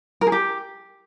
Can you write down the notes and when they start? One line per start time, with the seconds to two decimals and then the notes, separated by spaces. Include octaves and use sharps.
0.21 A#4
0.27 G#4
0.32 G4